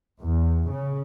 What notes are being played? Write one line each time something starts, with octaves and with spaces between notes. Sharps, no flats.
E2
C#3